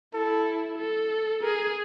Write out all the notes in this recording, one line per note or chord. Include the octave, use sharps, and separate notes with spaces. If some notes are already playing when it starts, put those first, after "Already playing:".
E4 A4
A4
G#4 A#4